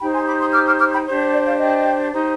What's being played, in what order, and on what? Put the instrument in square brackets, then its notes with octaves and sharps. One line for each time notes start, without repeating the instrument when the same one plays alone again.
[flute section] D#4 G4 C5 G5 B5
G#5 C6
B5 D6
C6 D#6
D6 F6
D6 F6
D6 F6
G5 B5
D4 G4 C5
D5
D5 F5
D#5 G5
D#4 G4 C5